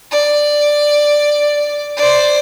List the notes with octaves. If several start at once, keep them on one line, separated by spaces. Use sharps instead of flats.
D5
C5 D5